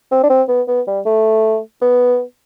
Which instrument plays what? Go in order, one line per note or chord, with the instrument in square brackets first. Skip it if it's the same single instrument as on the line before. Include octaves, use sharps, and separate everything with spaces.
[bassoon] C4
D4
C4
B3
B3
G3
A3
B3